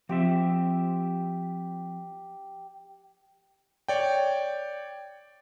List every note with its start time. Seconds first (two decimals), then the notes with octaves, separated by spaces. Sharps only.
0.09 F3 C4 G4 E5
3.88 C#5 D5 G5